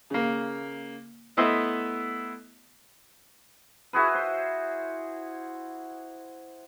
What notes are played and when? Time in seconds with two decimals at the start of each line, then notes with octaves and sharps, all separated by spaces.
0.10 C#3 A#3
1.37 A3 B3 E4 C5 D#5 E5
3.93 E4 F#4 G#4 B4
4.15 C5